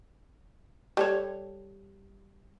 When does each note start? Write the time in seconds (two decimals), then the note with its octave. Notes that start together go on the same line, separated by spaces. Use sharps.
0.97 G3 A4 C#5